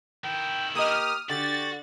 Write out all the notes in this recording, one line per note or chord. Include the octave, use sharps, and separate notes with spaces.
D#3 E4 G5
A#3 G4 D#5 D#6 F6
D3 F#4 G4 A6